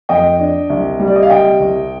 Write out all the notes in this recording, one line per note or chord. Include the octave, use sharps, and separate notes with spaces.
F2 D#5 G5
D4
C2
G3
D5
D#5
F5
C3 D#5 G5
C2